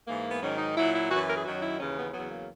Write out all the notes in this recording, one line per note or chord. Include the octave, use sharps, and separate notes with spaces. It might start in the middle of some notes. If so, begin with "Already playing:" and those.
G#2 E3 A#3
B3
G#2 D#3 F#3 C#4
D#4
A#2 F#3 E4
E4
F#2 E3 F#4
A#4
G#4
F#2 D#3 F#3 F#4
E4
D#2 C#3 E3 C#4
B3
E2 C#3 F#3 B3
A#3